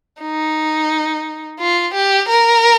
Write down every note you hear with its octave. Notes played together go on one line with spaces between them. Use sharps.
D#4
F4
G4
A#4